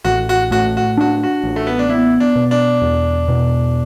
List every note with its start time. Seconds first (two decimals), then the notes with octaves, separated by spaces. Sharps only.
0.05 A1 F#4
0.29 F#4
0.51 A2 F#4
0.77 F#4
0.97 D4 F#4
1.23 F#4
1.44 A1
1.56 A3
1.67 B3
1.79 D4
1.89 B3 E4
2.20 D4
2.36 B2
2.51 D4
2.82 E2
3.28 B2